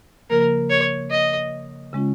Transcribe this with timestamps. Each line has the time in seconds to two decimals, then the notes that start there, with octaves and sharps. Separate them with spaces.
0.30 C#3 F3 A#3 A#4
0.70 C#5
1.11 D#5
1.93 C#3 G#3 C#4 F4